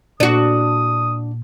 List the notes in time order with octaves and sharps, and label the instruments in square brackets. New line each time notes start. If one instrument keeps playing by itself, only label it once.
[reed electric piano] A#2 [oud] D4 F#4 [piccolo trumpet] D#6